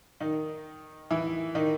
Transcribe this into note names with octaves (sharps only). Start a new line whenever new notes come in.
D#3 D#4
E3 E4
D#3 D#4